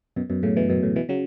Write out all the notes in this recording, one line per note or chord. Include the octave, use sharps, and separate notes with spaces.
F#2 B2
F#2 B2
A2 C#3
B2 E3
F#2 B2
A2
B2 E3
C#3 F#3